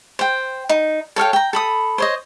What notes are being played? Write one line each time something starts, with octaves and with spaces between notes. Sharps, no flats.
C5 G5
D#4
A4 C#5 F5 G5
G5 A#5
A4 B5 D#6
C5 C#5 D#5